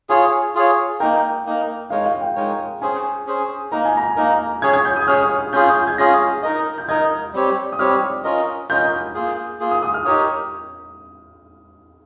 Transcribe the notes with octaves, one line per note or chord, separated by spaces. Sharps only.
F4 G#4 C#5 G#5
F4 G#4 C#5
A#3 D#4 A#4 G5
A#3 D#4 A#4
G#3 D#4 A#4 C#5 F5
F5
G5
G#3 D#4 A#4 C#5
C#4 G#4 C5 G#5
C#4 G#4 C5
A#3 D#4 A#4 A#5
G#5
A#5
A#3 D#4 A#4
C#4 G#4 C#5 G#6
G#6
G6
D#6
C#4 G#4 C#5 F6
C#4 F4 G#4 G6
G6
G6
G#6
C#4 F4 G#4 A#6
D#4 A#4 D#5
G6
D#4 A#4 D#5 G#6
G3 C4 G4 C#5
D#6
G3 C4 G4 C#5 F6
C#4 F4 A#4 D#5
C#4 F4 A#4 D#5 G6
A#3 F4 G#4
A#3 F4 G#4
D#6
D#6
F6
D#4 G4 A#4 C#5 D#6